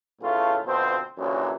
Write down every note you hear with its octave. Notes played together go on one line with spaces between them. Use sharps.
B1 A2 C#3 A3 F4
D2 B2 F3 C4 C5
A#1 F#2 A#2 D3 E3 F#3